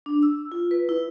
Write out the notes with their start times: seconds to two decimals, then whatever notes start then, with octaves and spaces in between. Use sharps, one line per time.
0.06 D4
0.23 E6
0.52 F4
0.71 B4
0.89 E4